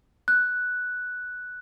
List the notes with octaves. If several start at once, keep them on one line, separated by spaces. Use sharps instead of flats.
F#6